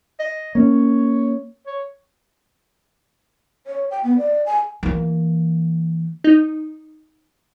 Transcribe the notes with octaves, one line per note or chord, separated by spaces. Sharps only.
D#5
A#3 C#4 C#5
C#5
C#5
G5
B3
D5
G#5
E3 A#3
D#4